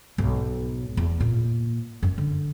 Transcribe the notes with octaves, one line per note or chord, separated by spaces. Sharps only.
B1 G#2
E2
A#2 A#3
F#2
D3